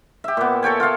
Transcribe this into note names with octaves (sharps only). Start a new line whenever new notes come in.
G4 E5
A#2 B3
A4 C#5 G5 G#5
F4 C#5 F5 A5